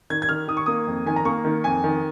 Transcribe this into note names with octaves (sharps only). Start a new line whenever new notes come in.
D#3 G#6
G#6
D#3 F6
D#3 D#6
C#6
A#3 D#6
F2
D#3 G#5
A#5
A#3 C#6
D#3
F2 G#5
D#3